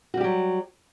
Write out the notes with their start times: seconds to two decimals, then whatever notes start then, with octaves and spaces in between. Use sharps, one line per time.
0.14 F#4
0.17 G3
0.21 G4
0.24 F#3